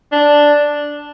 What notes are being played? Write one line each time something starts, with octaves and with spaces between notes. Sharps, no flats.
D4